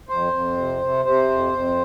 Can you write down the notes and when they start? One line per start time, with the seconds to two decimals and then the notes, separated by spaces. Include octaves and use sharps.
0.09 F2 C5
0.33 F2
0.57 C3
0.81 C3
1.05 C3 C5
1.30 F2
1.53 F2